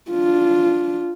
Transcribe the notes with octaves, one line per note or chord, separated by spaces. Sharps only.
D4 F4